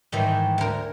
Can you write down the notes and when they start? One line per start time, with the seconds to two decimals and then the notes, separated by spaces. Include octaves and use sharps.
0.12 G#2 D#3 E3
0.58 D2 A#4